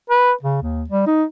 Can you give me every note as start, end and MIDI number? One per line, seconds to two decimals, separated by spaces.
0.10 0.32 71
0.43 0.59 49
0.62 0.84 39
0.90 1.06 55
1.07 1.24 63